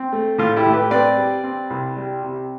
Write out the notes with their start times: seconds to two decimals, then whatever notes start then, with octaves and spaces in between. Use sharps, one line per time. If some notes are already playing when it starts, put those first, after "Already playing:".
Already playing: C4
0.12 A3
0.38 A2 F4
0.56 E4 G4
0.66 A2
0.73 G4 B4
0.91 C4 B4 D5
1.17 G3
1.44 C4
1.70 C2
1.96 G3
2.23 C3